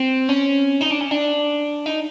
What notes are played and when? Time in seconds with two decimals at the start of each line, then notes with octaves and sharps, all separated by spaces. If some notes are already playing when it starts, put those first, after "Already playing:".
Already playing: C4
0.29 C#4
0.81 D#4
0.91 D4
1.01 C#4
1.11 D4
1.86 D#4